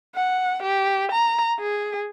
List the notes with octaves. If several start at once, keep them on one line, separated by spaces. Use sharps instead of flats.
F#5
G4
A#5
G#4